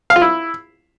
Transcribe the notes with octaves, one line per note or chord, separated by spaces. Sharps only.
F5
F4
E4